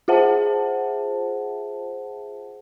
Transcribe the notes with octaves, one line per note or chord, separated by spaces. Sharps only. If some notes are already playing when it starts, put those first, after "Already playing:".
F4 G#4 C5 E5 F#5 A5